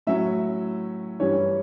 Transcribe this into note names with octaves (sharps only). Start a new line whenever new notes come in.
A2 F#3 C#4 E5
G2 E3 G3 C#4 C#5